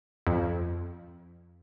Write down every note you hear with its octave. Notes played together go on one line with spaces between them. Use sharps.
F2